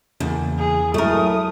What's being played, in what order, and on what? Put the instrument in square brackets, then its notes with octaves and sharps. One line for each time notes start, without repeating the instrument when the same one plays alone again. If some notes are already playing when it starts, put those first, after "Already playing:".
[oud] E2 [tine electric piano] C#3 A#3
[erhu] G#4
[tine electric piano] F#3 G#3 E4 [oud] A3 A#4 [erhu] D#6